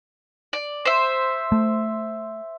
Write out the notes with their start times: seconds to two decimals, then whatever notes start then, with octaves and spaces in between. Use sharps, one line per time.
0.53 D5
0.85 C5 E5
1.52 A3